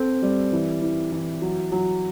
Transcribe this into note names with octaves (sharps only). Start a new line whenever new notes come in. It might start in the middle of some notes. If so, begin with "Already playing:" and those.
Already playing: C4 A4
G3
E3
E3
E3
F#3
F#3